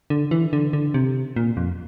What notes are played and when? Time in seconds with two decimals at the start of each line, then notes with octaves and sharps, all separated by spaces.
0.10 D3
0.31 E3
0.53 D3
0.73 D3
0.94 C3
1.36 A#2
1.57 F2